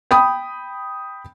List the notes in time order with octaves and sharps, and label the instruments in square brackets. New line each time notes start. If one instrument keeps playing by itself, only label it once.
[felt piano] G5 B5 D#6